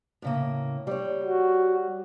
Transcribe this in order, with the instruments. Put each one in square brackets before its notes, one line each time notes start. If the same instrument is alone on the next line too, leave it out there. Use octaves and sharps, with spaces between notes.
[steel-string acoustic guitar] A2 C#3 A#3
G3 C#5
[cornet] F#4